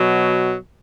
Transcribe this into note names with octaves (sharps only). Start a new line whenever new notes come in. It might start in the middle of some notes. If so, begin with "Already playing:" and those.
Already playing: B2 F#3